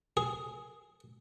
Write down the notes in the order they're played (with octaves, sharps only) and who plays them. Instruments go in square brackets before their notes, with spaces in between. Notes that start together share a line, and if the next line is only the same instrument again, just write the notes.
[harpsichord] G#4